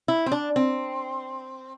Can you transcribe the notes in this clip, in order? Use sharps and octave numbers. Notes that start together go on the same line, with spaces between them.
E4
C4
D4
C4